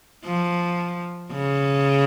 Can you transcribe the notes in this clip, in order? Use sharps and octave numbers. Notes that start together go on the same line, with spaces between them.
F3
C#3